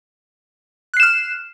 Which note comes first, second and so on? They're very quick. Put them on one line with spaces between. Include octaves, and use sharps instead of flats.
F#6 C7 E7 F6